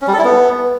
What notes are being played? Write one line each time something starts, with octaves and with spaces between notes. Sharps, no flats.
C#4
G3
A4
E4
B3